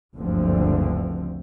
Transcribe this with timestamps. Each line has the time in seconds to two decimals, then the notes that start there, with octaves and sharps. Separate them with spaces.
0.15 F#1 D2 G2 D3 F3 C4